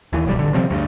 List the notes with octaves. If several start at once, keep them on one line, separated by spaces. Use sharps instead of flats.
D#2 E3
D1 B1 G3
A1 D3
C3 F3 G3 C4
D2 G2